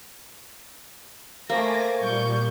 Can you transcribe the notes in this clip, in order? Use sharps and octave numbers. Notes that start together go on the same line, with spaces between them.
A3 A#3 C5 G#5 D6 A#6
A#2 G3 C#6 G6